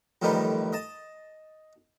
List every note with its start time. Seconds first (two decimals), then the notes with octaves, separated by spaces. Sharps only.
0.22 F2 A2 D#3 E3 G3 D#4
0.73 D#5 A5